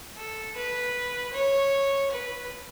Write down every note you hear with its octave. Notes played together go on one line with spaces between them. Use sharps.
A4
B4
C#5
B4